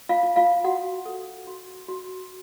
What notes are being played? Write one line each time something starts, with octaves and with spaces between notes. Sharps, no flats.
F4 F5
F4
F4 F5
F#4 F#5
A4
F#4
F#4